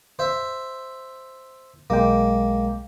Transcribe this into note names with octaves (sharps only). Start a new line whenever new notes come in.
C5 E5
B1 G#3 A#3 G5